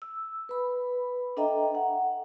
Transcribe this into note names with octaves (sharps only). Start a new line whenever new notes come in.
E6
B4 B5
D4 A4 D#5 E5 G5 A#5
F#5